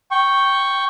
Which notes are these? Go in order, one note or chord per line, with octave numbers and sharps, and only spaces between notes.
G5 C#6